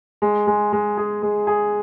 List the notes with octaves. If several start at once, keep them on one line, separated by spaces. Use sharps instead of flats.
G#3
G#3
G#3
G#4
G#3
G#4